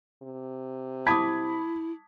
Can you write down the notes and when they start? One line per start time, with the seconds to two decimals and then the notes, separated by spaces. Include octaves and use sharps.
0.22 C3
1.07 E4 A5 B5 D6 D#6 G#6 B6